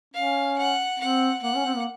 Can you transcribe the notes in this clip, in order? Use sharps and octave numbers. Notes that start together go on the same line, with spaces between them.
C#4 F5
F#5
C4 F#5
A#3 F#5
C#4
C4
A#3